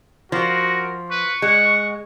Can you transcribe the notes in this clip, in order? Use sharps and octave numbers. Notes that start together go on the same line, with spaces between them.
F3 F#4 A#4
B4 C#6
G#3 F#5